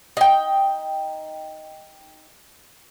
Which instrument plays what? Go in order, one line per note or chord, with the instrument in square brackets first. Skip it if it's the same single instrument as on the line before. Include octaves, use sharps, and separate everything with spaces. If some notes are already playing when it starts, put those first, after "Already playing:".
[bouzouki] D#4 G5